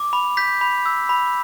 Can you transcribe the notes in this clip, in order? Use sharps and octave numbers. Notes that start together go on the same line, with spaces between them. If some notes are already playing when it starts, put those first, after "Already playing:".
Already playing: D6
B5
G6 B6
B5
E6
B5